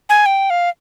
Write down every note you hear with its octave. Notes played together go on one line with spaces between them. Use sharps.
G#5
G5
F5